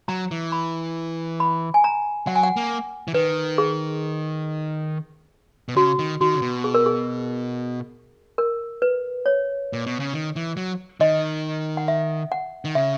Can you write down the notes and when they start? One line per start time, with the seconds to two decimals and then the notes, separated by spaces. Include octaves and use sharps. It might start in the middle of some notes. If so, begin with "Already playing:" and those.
0.08 F#3 A#5
0.31 E3
0.52 B5
1.40 B5
1.74 G#5
1.84 A#5
2.27 F#3 F#5
2.35 G#5
2.43 F#5
2.57 A#3
3.08 E3
3.14 D#3 B4
3.58 G#4
5.69 B2
5.76 C#3 F#4
5.99 D#3
6.21 D#3 F#4
6.35 C#3
6.42 B2
6.64 G#4
6.74 A#4
6.86 G#4
8.38 A#4
8.82 B4
9.26 C#5
9.73 A#2
9.86 B2
10.00 C#3
10.14 D#3
10.36 E3
10.57 F#3
11.00 D#3 D#5
11.77 F#5
11.88 E5
12.32 F#5
12.65 D#3
12.75 C#3 E5